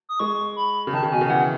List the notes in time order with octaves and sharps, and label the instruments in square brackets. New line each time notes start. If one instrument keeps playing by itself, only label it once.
[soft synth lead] D#6
[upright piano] G#3 [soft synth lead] C#6
[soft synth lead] B5
[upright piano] C#3
[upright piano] D#3 [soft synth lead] A5
[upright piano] C#3
[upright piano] B2 [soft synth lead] G#5
[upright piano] C#3
[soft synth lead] G#5
[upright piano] E3 [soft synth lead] F#5